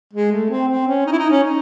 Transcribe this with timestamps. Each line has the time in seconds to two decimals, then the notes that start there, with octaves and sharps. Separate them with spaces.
0.13 G#3
0.32 A3
0.50 C4
0.68 C4
0.87 C#4
1.06 D#4
1.12 E4
1.19 D#4
1.31 C#4
1.43 D#4